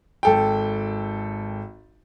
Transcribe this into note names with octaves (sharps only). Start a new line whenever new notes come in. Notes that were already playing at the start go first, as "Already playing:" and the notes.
G#1 A4 G5